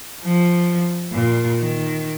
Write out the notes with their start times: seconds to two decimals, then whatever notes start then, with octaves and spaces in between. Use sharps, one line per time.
0.24 F3
1.12 A#2
1.59 D#3